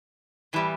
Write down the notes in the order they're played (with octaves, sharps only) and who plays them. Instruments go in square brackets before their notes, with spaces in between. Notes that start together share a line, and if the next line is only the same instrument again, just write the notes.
[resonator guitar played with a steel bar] A2 E3 G3 B3